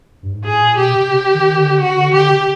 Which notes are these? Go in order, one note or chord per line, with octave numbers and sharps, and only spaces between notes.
G2
G#2
A2 G#4
A#2
B2 G4
C3
C#3
D#3
D3
C#3 F#4
D3
D3 G4
C#3